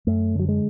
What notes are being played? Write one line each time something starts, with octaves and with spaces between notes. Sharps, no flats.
F#2 A3
D3 F#3
G#3